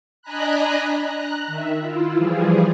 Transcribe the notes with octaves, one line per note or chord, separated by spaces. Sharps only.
D4 D#5 G#5 A#5 B5 F#6
A#5 F#6
D#3 E5
E4 F4
E3 F3 G3 G#4